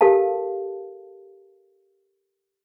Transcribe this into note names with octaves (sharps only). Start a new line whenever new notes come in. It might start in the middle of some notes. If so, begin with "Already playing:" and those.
G4 A4 A#4 F5 A5